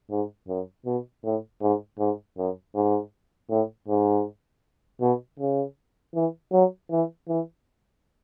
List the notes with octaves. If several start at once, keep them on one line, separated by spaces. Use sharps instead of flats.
G#2
F#2
B2
A2
G#2
G#2
F#2
G#2
A2
G#2
B2
C#3
E3
F#3
E3
E3